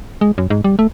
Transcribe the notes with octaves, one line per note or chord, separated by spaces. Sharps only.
G#3
F#2
G#2
G3
A3